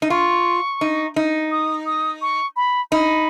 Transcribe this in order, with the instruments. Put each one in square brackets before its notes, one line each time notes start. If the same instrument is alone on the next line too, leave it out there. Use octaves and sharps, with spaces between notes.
[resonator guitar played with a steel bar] D#4
[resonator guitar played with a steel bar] F4 [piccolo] C#6
[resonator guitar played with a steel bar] D#4
D#4
[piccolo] D#6
D#6
C#6
B5
[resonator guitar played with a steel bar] D#4 [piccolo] B5